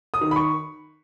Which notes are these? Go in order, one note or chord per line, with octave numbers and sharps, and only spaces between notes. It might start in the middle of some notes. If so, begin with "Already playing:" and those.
D#6
D#3
B5
C#6